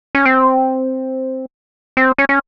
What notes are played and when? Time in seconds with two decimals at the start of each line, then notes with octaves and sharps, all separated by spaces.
0.15 C#4
0.26 C4
1.97 C4
2.18 C#4
2.29 C#4